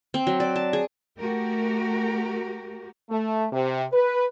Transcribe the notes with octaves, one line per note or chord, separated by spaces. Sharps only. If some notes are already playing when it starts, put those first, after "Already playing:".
C4
F#3
D5
A5
G#4
A3 F#4 G4 A#4
A3
C3
B4